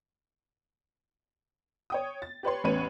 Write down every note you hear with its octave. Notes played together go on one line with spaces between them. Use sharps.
C#5 G5 D#6
A6
G4 B4 C#5 C6
A1 E2 C#4 B4 C#5 D#7